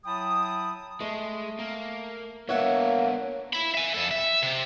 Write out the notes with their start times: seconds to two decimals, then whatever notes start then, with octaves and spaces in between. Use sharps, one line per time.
0.05 F#3 E4 G5 A5 B5 D#6
1.00 G#3 A3
1.59 A#3
2.49 A#3 B3 D4 C#5 E5 F#5
3.53 E5 B5
3.75 E5 G#5
3.94 F2 A4
4.11 E5
4.43 C3